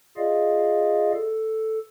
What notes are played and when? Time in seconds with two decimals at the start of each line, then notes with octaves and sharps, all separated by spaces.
0.17 F4 G#4 D5 D#5 F5
1.14 A4